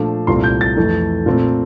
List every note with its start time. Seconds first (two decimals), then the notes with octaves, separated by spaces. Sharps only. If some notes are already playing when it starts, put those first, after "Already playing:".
Already playing: A#2 F3 A3 D4
0.27 C2 A#2 A3 C4 C6
0.44 G6
0.61 A6
0.77 F2 E3 A3
1.26 A#2 A3 C4